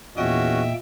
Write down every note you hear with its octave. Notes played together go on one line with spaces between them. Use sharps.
E2 A#2 A#3 C#4 F#4 D#5 E5 G5